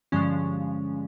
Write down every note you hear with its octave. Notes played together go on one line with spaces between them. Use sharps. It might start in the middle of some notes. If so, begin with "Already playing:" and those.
G2 D3 F3 G#3 C#4